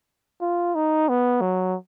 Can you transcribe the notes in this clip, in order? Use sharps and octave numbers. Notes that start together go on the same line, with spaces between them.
F4
D#4
B3
F#3